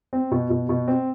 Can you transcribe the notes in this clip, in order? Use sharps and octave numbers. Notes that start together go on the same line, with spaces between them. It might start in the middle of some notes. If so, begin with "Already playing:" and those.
C4
B2
B2
B2
C4